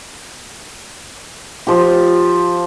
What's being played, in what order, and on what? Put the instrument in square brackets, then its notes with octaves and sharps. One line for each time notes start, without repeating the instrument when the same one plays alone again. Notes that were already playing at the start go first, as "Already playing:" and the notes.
[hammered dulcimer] F3 G4